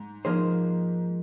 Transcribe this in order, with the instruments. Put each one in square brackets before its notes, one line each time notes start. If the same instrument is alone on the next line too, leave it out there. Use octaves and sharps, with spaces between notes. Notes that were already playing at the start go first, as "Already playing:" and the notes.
Already playing: [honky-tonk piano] G#2
[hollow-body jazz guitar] F3 A#3 D#4 G#4 C5